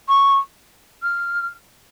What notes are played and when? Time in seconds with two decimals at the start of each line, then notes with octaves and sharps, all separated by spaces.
0.08 C#6
1.03 F6